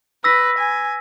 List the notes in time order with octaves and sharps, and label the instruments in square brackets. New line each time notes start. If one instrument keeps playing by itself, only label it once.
[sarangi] B4 [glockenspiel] E6 A#6 B6
[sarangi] G#5